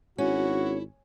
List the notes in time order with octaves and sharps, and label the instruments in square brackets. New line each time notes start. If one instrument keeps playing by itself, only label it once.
[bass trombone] G#1 [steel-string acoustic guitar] C#4 [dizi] E4 [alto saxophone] F#4